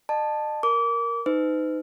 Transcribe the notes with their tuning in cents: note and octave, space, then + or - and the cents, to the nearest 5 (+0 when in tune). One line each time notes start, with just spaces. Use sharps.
D#5 -40 A5 +0
A#4 +0 D6 -30
D#4 +0 B4 +45